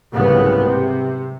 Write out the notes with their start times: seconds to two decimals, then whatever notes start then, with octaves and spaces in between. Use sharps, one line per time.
0.13 F#1 C2 G#2 C#3 B3
0.63 C3